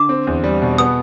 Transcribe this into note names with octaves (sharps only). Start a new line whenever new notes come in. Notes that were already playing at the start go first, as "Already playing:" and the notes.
Already playing: D3 D6
C4
E2
G3
B2
B3 D#6